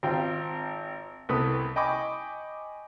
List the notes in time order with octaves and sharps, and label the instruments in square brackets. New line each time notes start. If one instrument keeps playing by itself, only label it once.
[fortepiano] G#1 C4 F4 C5 G5
C2 B3 A4 B4 D#6
D#5 G5 G#5 B5 C#6 D6